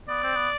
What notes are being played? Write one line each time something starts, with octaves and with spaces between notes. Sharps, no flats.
B3 D5
C4
B3